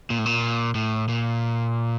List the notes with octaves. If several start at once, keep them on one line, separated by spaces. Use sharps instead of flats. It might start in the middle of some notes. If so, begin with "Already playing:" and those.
A#2
A2
A#2
A2
A#2